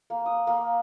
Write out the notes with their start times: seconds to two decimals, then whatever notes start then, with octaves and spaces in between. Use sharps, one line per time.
0.10 A#3
0.26 D#6
0.47 A#3